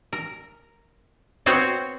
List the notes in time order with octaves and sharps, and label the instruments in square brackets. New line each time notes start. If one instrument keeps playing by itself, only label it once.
[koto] A#4
B3 C4 F#4 C5 C#5